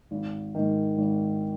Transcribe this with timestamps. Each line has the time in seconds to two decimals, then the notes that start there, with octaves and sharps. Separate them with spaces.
0.11 G#1
0.55 G#2 D#3
0.98 G#1